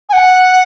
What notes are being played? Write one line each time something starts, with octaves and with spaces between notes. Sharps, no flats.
G#5
F#5